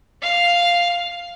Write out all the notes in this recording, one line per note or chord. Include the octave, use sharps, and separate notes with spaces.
F5